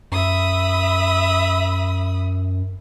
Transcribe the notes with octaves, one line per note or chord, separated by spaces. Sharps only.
F#2 E5 B5 D#6